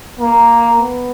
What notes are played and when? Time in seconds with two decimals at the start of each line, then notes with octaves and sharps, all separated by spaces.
0.19 A#3
0.80 B3